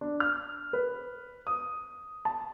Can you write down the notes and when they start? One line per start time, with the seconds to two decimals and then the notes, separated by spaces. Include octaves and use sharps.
0.01 D4
0.20 F6
0.73 B4
1.47 D#6
2.25 A5